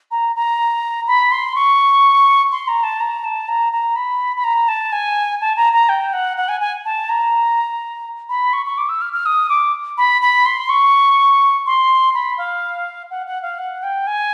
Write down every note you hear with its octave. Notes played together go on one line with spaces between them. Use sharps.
A#5
A#5
B5
C6
C#6
C6
A#5
A5
A#5
A5
A#5
A#5
B5
B5
A#5
A5
G#5
A5
A#5
A#5
G5
F#5
F#5
G#5
G#5
A5
A#5
B5
C#6
C#6
D6
E6
F6
F6
D#6
D6
B5
B5
C6
C#6
C6
B5
F5
F#5
F#5
F5
F#5
G5
G#5